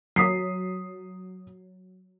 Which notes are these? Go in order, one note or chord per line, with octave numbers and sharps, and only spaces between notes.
F#3 D#6 B6 C7